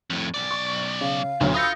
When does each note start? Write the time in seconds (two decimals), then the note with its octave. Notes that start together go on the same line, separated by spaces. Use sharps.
0.10 F2 A2
0.34 B1 D5
0.51 C#6
1.01 C#3 F5
1.41 D2 B2 F#3
1.54 F4 B5 D#6 E6 G6 A#6 C#7